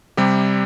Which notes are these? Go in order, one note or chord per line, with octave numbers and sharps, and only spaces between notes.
C3 G3 G4